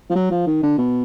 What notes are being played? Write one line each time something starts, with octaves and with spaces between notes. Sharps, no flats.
F3
F#3
F3
D#3
D3
B2